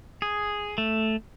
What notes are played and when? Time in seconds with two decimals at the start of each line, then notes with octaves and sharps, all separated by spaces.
0.22 G#4
0.78 A3